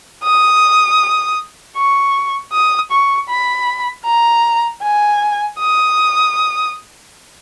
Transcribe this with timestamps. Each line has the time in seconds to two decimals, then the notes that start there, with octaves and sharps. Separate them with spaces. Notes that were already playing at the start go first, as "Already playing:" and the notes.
0.24 D#6
1.77 C#6
2.52 D#6
2.92 C#6
3.29 B5
4.06 A#5
4.82 G#5
5.59 D#6